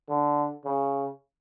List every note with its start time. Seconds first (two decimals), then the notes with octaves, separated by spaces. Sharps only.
0.08 D3
0.65 C#3